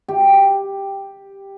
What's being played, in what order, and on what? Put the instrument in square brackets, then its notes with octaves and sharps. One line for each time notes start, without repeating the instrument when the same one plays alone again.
[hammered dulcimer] G4